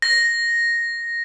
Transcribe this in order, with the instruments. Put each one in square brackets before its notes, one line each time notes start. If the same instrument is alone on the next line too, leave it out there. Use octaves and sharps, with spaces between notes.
[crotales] A#6